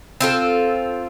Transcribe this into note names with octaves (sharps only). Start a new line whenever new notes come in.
C4 F4 A4